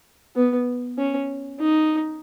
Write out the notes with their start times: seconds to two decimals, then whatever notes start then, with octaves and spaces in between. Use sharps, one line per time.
0.36 B3
0.98 C#4
1.60 D#4